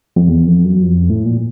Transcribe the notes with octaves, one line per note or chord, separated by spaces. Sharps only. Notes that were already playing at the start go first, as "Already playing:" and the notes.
F2
E2
F2
F#2
F2
A2
A#2